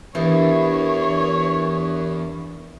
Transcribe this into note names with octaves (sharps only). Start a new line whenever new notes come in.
E2 E3 D4 G4 A#4 C#5